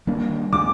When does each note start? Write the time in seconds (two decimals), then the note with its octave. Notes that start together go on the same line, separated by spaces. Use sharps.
0.07 D#3 G3 A#3 D4
0.52 D#3 A3 D4 D6